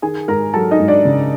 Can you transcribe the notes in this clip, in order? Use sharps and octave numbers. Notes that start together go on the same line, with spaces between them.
D#3 G#4 G#5
G#2 A#4 A#5
F#3 A4 A5
D#4 D#5
G#2
D4 D5
C#3